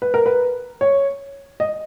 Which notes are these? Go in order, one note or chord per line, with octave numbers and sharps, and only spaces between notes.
B4
A#4
B4
C#5
D#5